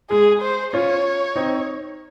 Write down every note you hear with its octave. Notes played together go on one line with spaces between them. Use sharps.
G#3 G#4
C5
C#4 F4 C#5
C4 D#4